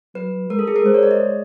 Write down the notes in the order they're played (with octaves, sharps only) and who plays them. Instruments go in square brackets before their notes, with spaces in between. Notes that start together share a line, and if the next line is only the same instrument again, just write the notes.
[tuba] F#3 [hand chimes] B4
[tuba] G#3 [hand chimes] A#4
[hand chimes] A4
G#4
A#4
[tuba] G#3 [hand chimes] C5
[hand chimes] C#5
D5
D#5